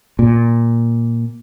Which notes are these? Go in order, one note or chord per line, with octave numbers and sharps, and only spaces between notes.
A#2